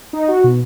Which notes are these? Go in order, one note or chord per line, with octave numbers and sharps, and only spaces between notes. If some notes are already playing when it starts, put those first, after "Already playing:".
D#4
F#4
B2